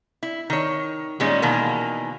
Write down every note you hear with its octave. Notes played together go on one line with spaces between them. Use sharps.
E4
D#3 C#5
A#2 D#3 G3 G#3 C#4
B2 D#3 E3 A#3